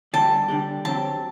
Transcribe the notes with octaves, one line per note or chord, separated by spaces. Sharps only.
D3 G3 D4 G4 A5
D3 G3 D4 G4
D3 F#3 C4 G4 A5